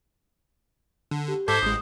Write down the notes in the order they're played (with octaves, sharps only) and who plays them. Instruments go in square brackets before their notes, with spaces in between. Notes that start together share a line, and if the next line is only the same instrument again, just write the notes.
[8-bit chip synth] D3
[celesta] G4
[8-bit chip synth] G#2 A4 G#6 [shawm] C5 [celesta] D6 G6 B6
[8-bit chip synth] A1 G#3 [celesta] D#6